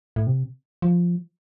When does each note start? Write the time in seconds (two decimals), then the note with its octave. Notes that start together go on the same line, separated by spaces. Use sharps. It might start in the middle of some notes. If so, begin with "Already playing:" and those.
0.16 A2
0.27 C3
0.82 F3